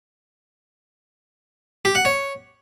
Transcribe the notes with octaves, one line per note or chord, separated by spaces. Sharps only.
G4
F#5
C#5